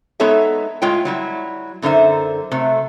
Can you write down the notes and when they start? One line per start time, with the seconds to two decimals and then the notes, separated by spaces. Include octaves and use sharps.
0.20 G#3 B3 D#4 A4 C#5 E5
0.82 A2 G#3 F4 C#5 G5
1.05 F#3 G3 E4
1.82 F#2 D3 D#4 C5 E5
2.52 C3 F#3 A3